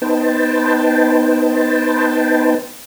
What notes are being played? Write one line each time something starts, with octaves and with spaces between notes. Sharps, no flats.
B3 D#4 B4 C5 G5 A5